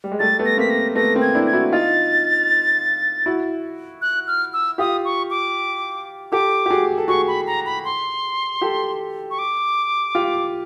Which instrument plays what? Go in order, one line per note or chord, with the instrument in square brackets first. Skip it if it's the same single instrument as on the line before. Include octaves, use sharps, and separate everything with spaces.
[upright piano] G3
G#3
[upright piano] G3 A3 [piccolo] A6
[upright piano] A3 B3
[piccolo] A#6
[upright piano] A#3 C4 [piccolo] B6
[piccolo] A#6
[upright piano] A3 B3 [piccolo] A#6
[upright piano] A#3 C4
[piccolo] G#6
[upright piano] D4 E4
[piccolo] G#6
[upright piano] E4 F#4
[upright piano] D#4 F4 [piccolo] A6
[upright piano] E4 F#4
[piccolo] F#6
F6
E6
[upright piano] F4 G4 [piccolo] D#6
[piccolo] C#6
D6
[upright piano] G4 A4 [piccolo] D6
[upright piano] G4
F#4 G#4
A4
[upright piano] F#4 G#4 [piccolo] C#6
[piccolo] B5
A#5
B5
C6
[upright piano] G4 A4
[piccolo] C#6
D6
[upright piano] F4 G4